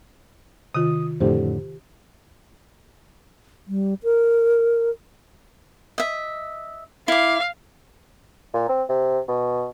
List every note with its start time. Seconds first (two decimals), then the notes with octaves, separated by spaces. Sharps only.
0.74 C3 D#3 F4 D#6
1.20 F2 A2 D3 G4 C5
3.67 G3
4.03 A#4
5.98 D#5 E5
7.08 E4 F5 D6
8.53 A#2
8.69 C4
8.89 C3
9.28 B2